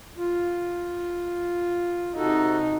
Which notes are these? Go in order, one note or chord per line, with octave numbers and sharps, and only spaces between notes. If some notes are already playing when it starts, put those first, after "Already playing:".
F4
C3 D#4 F#4 A4